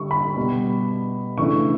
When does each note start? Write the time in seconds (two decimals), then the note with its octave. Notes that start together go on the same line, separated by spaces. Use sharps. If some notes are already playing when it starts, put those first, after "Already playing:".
Already playing: D3 G3 C#6
0.11 B5
0.36 B2 G3 B3
1.38 C#3 E3 A3 D4 C#6